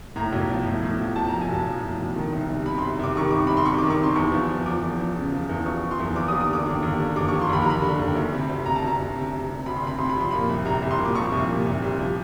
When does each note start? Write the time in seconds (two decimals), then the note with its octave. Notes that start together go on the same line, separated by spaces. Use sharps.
0.16 A2 A#5
0.33 B1
0.49 F3
0.66 A2
0.82 A2
0.99 F3
1.16 F3 A5
1.29 F3 A#5
1.41 G#5
1.49 B1 A5
1.66 F3
1.83 A2
2.00 B1
2.16 D#3
2.33 C2
2.49 C2
2.66 C3 B5
2.78 C2 C6
2.99 C2 D6
3.16 D#3 C#6
3.31 C2 D6
3.47 C2 B5
3.57 C6
3.65 C3 C#6
3.78 D#3 D6
3.90 C#6
3.99 C3 C6
4.16 E2 C#6
4.32 F3
4.50 F3
4.66 F3 D6
4.83 E2
4.99 F3
5.16 C#3
5.32 F3
5.49 E2
5.66 F3 C#6
5.83 F3
5.91 C6
5.99 E2
6.16 D#2 D6
6.28 D#6
6.32 D#2
6.41 D#6
6.49 D3 D6
6.66 D#2
6.83 D#2
7.00 D3
7.16 D#2 D6
7.28 F3 C#6
7.41 C6
7.49 D#2 B5
7.62 A#5
7.66 D#2 B5
7.82 D3
7.99 D#2
8.15 D2
8.32 C3
8.50 D2
8.66 C3 A#5
8.76 A5
8.82 D2 A#5
8.99 D2
9.16 C3
9.32 C3
9.49 C3
9.66 D2 B5
9.76 C6
9.83 C3 B5
9.99 C3 C6
10.10 B5
10.16 F3 C6
10.31 A#2 B5
10.49 C2
10.65 C2 A#5
10.82 C2
10.91 C6
10.98 A#2
11.05 D6
11.15 F3 C#6
11.32 C2
11.49 A#2
11.66 C2
11.82 C2
11.99 F3